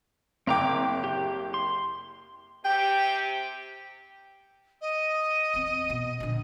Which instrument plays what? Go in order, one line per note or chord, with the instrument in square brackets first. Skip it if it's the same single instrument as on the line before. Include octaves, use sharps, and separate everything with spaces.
[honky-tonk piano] F#1 G5 [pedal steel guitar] C4 A#5 D6
[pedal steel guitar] G4
C6
[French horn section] C3 G4 [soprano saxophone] G5
[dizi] D#5
[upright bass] E2 C4
B2
A#1 D3